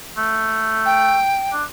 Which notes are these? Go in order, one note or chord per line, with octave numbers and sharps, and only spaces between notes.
A3
G5
D4